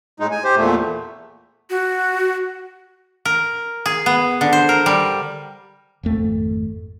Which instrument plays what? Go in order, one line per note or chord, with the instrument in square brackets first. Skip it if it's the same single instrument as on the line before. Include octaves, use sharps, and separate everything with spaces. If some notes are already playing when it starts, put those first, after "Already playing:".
[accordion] A2 G#3 D#4
G#5
G4 C5
E2 A#2 A3
[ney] F#4
[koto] A#4
G#4
B3
D3
C5
A#4
G3
[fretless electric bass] G#1 F2 A3